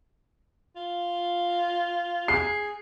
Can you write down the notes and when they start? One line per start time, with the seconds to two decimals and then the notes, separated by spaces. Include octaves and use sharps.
0.76 F4
2.28 G#4 C7